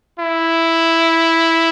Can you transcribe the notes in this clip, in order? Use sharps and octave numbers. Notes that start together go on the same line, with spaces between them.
E4